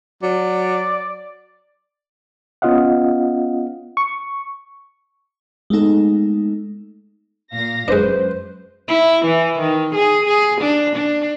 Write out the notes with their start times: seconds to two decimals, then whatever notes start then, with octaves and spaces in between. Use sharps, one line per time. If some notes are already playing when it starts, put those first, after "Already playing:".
0.23 F#3 D5
2.62 B3 C#4 F4 D#5 F5 F#5
3.97 C#6
5.70 G#3 A3 B3 D#4 A4
7.53 A#2 F5 A#6
7.88 F#2 G#3 D4 B4 C5
8.88 E4
9.25 E3
9.59 D#3
9.95 G#4
10.26 G#4
10.61 D4
10.96 D4